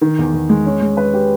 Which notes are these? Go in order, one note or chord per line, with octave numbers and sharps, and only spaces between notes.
D#3
E2
E2
G#3
C#4
G#3
B4
G4